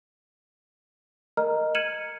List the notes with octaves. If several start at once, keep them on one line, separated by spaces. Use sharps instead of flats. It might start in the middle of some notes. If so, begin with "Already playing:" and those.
A#4 D#5 A#5 F6
F6 G#6 C#7 D#7 E7 F#7